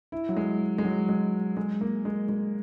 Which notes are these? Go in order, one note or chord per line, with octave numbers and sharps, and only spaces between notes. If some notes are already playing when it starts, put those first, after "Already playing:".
E4
F#3
G#3
G#3
F#3
G#3
G#3
A#3
G#3
G#3